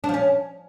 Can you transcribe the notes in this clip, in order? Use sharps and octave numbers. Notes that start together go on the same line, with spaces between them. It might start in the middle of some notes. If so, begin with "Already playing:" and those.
D4
F3
C#4